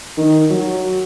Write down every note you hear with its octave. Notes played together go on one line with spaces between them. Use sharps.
D#3
F#3